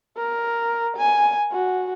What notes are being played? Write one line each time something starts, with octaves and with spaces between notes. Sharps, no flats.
A#4
G#5
F#4